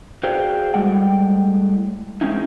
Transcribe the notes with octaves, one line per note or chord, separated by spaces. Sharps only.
F#4 G#4 C5 D5 F5 G5
A2 G3 G#3 F#5 G5
G#3 C4 C#4 D#4 E4